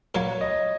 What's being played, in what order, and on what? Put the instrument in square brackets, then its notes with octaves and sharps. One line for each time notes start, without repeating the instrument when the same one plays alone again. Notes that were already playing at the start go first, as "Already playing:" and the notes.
[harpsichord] A#2 F#3 A#3 [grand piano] C#5
[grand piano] D#5